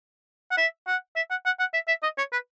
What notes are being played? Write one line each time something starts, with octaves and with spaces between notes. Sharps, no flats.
F#5
E5
F#5
E5
F#5
F#5
F#5
E5
E5
D#5
C#5
B4